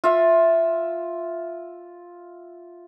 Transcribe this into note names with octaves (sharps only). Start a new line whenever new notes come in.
F4 E5